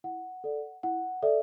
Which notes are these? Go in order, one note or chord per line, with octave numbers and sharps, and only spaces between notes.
E4 F#5
A4 D5
E4 F#5
A4 D5 E5